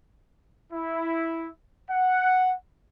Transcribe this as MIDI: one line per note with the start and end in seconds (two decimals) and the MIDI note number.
0.73 1.50 64
1.89 2.55 78